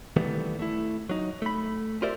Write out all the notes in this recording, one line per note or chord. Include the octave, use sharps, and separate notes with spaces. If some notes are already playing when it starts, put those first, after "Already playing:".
D#3 E3 G3 A3 B3 C4
A3 E4
F#3 D#4
A3 B5
F4 G4 A#4 C5 D5 E5